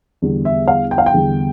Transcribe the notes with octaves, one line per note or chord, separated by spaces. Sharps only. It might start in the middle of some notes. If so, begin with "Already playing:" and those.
E2 D3 G3
E5
F5
G5
F5
G5
E2 D3 G3